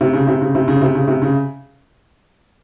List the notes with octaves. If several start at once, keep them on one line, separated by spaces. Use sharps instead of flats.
C3
C#3
C3
C#3
C3
C#3
C3
C#3
C3
C#3